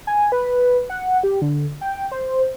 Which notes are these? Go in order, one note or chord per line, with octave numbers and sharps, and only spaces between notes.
G#5
B4
F#5
G4
D3
G5
C5